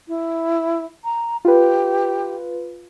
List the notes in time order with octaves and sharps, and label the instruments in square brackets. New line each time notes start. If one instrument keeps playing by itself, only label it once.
[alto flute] E4
A#5
[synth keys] F4 B4 [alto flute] G4